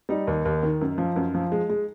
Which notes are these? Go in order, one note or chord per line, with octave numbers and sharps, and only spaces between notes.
G3 D#4
D#2
D#2
D#3
F#2
F3
F#2
F3
G#3
G#3